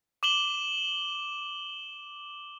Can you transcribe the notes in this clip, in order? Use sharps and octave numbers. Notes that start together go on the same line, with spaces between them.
D6 E7 F#7 G7